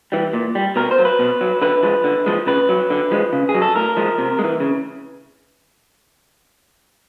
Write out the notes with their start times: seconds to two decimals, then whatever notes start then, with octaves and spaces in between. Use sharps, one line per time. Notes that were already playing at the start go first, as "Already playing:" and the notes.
0.12 E3 G3
0.33 A#2
0.55 G3
0.76 B2 A#4
0.91 C5
0.98 F#3
1.05 B4
1.19 B2
1.41 F#3
1.62 D3 B4
1.83 F3 G#3
2.04 D3
2.26 F3 G#3
2.47 C#3 B4
2.69 F#3
2.90 D3
3.11 F3 G#3
3.33 C#3
3.49 G#4
3.55 F#3
3.62 A4
3.75 A2 A#4
3.97 F3 G#3
4.18 C3
4.39 G#3
4.44 E3
4.60 C#3